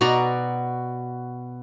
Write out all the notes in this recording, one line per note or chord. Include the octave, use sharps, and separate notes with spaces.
B2 F#4 D5 A#5